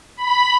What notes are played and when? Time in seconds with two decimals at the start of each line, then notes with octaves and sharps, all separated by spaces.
0.16 B5